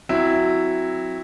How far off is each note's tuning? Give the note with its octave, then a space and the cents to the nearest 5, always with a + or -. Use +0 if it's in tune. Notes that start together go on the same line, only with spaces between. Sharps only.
F#3 +0 C4 +10 E4 +0